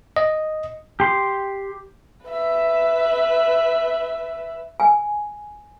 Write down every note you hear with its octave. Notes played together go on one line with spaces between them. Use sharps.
D#5
G4 C6
B4 E5
G#5